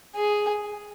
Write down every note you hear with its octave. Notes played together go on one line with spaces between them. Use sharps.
G#4